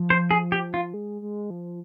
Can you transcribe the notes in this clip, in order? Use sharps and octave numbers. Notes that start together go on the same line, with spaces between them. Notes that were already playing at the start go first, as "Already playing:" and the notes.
Already playing: F3
C5
G#4
G4
F4
G#3
G#3
F3